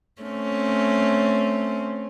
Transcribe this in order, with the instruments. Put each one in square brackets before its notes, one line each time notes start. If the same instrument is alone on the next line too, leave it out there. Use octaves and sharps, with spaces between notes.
[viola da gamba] A3 C4 C#4